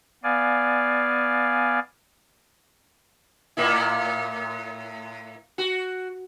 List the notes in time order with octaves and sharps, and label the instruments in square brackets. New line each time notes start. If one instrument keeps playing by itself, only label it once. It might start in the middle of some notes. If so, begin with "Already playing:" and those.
[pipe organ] B3 D5 F5 G#5
[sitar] A2 A#3 E4
F#4